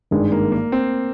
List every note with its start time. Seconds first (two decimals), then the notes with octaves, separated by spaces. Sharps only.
0.11 G#1 G2 D#3 G#3
0.32 A#3
0.52 A#3
0.72 C4